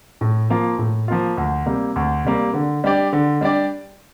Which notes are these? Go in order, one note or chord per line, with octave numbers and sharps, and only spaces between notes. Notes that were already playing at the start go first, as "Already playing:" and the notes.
A2
F3 A#3 F4
A2
F3 A#3 F4
D2
C3 G3 A#3
D2
C3 G3 A#3
D3
G3 D4 G4 D5
D3
G3 D4 G4 D5